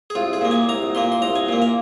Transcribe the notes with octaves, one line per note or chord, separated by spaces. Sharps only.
G#4
C2 F4
G#4
A#2 A#3
G#5
C2 A#5
A#2 A#3 C6
C6
C2 A#5
G#5
A#2 A#3
F5